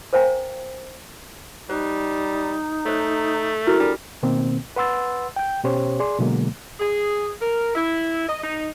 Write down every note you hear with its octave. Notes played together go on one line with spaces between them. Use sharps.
A#4 C5 F5 G5 G#5 A#5
G3 D#4 C5
A3 C5 C#5
E4 F#4 A#4
G3 D4 A4
B2 D#3 A#3 C4
B4 F#5 C6 E6 A6
G5 G6
B2 C#4 G4 C5 C#5
G#4 D5 C6
B2 D3 F#3 G#3 A#3
G#4
A#4
E4
D#5
D#4